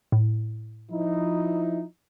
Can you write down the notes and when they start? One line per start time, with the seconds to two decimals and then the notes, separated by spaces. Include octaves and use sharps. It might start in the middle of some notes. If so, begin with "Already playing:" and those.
0.12 A2
0.91 F3 D#4 E4